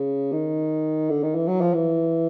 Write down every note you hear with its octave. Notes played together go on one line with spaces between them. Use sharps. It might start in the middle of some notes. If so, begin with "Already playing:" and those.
Already playing: C#3
D#3
D3
D#3
E3
F#3
F3
E3